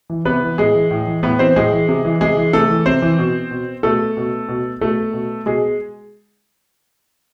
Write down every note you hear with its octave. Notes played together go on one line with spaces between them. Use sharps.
E3
C3 B3 B4
E3
A2 G#3 G#4
E3
A2
E3
A2 B3 B4
E3 C4 C5
A2 G#3 G#4
E3
C3
E3
C3 G#3 G#4
E3
C3 A3 A4
E3
C3 C4 C5
E3
B2
B2
B2 A3 A4
B2
B2
B2 A3 A4
B2
B2 G#3 G#4